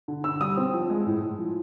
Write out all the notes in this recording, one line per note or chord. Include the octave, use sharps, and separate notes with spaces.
D3
D3 E6
G3 D#6
C4
F3
G#3
A2
A2
F3